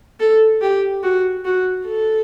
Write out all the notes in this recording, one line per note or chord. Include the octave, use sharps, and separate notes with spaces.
A4
G4
F#4
F#4
A4